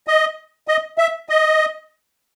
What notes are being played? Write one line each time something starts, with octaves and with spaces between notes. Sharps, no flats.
D#5
D#5
E5
D#5